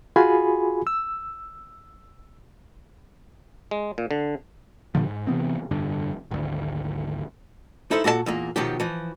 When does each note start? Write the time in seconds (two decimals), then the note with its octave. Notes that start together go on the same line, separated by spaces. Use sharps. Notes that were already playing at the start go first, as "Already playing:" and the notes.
0.16 F4 F#4 G#4 G#5 B5
0.87 E6
3.71 G#3
3.98 A#2
4.11 D3
4.95 G2 A#2 D3 F3
5.07 G#2
5.27 C3 E3 B3 C4
5.71 F1 G2 D3
6.31 G#1 D2
7.91 D#4 E4 A4 B4 C5
8.04 A#2 F#4 A4 C5 A5
8.26 E2 A#2 A#3
8.56 B2 D#3 F3 F#3 G4
8.80 E3 F3